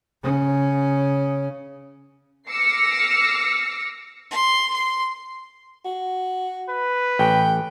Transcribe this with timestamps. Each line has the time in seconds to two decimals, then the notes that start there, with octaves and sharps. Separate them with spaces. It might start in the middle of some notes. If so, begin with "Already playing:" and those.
0.23 C#3 C#4
2.49 D6 E6 F6 A#6 C7 C#7
4.31 C6
4.73 C6
5.85 F#4
6.69 B4
7.19 A1 G5